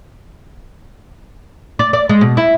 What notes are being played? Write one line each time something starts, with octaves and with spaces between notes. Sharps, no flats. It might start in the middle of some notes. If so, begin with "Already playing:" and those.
D5
D5
G#3
B2
E4